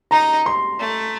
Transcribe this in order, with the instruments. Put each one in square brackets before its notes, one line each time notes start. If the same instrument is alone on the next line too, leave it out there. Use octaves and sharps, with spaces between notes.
[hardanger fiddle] D#4 [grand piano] A#5
[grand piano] C6
[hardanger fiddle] A3